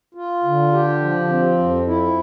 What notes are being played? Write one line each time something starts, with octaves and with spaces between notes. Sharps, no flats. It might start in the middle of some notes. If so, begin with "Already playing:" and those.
F4
D3
G4
F3
C4
F2
E4